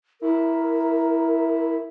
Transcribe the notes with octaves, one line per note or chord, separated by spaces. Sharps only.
E4 A#4